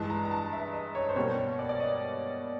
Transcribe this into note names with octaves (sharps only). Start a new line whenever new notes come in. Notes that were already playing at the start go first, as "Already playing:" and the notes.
Already playing: G2 E3 G#3 A5
A#5
A#5
A5
E5
D#5
C#5
C5
B2 G3 A#3 C#5
C#5
D5
D5
D#5